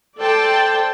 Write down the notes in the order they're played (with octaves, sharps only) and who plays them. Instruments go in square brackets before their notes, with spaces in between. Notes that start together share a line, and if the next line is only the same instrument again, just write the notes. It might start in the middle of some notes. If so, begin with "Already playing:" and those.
[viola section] A4 C5 D5 G5 A5